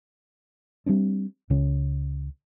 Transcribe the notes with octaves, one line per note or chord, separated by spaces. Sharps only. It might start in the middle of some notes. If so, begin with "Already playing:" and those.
G3 B3 C4 D4
C#2 C#3 C#4